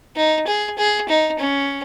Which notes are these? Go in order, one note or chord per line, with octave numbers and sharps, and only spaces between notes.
D#4
G#4
G#4
D#4
C#4